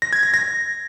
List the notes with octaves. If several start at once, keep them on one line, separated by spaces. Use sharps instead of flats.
A#6
G#6
A#6
A#6